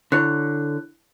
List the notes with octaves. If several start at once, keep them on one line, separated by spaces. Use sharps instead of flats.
D3 E4 C#5 F#6